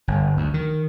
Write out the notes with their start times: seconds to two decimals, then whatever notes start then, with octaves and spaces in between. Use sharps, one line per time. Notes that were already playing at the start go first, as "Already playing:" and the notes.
0.08 G1
0.37 D2
0.54 D#3